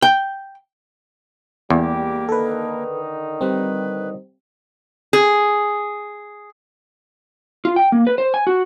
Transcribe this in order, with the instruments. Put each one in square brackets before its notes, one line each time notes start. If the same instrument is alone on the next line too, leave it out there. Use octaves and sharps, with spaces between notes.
[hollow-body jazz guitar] G5
[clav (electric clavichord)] E2 [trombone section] G3 G#3 G4 [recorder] A#3
[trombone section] D3 D#3 D#4 [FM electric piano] A4 B4
[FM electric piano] G3 C4 [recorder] B4
[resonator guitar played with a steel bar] G#4
[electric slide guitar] F4
G5
A#3
B4
C5
G#5
F#4